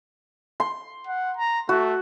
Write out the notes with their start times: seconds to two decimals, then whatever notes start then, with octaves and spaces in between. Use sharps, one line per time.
0.60 C6
1.07 F#5
1.37 A#5
1.69 A3 F#4